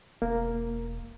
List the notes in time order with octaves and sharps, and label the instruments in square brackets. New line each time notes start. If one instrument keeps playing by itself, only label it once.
[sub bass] E1 [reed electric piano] A#3